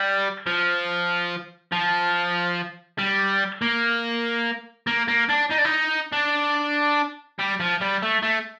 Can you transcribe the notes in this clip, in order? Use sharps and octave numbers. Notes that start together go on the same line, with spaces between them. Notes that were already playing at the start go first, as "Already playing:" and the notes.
Already playing: G3
F3
F3
G3
A#3
A#3
A#3
D4
D#4
D4
D#4
D4
G3
F3
G3
A3
A3